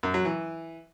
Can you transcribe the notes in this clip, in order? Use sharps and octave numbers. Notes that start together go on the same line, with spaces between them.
F#2
F#3
E3